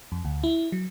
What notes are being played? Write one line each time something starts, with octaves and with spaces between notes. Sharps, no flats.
F2
D2
E4
F#3